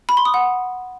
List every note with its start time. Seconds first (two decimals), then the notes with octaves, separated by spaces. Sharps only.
0.09 B5
0.17 C6
0.25 D#6
0.34 F#5